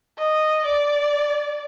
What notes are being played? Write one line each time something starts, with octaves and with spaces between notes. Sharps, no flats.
D#5
D5